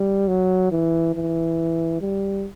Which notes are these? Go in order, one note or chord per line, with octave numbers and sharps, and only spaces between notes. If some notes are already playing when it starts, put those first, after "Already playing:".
Already playing: G3
F#3
E3
E3
G3